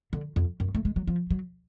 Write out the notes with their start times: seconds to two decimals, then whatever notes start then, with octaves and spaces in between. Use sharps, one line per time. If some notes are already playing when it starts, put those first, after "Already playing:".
0.13 D3
0.36 F2
0.60 F#2
0.75 A3
0.85 G#3
0.96 F#3
1.07 F3
1.30 F#3